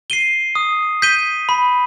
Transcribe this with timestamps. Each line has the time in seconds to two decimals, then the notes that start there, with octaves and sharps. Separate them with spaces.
0.10 C7 D#7 G7
0.55 D#6
1.02 G6 B6 D#7 G7
1.49 B5